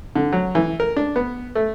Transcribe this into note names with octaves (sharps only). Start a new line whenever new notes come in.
D3
F#3
E3
A#4
D4
B3
A3